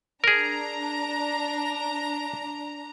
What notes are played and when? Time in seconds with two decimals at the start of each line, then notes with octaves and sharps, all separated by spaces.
0.24 D4 G#4 A#4 A#5